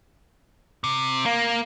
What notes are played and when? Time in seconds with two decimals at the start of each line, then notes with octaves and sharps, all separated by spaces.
0.84 C3
1.26 A#3